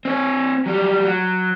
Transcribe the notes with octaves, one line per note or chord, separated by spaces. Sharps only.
C4 C#5
F#3 G3
F#3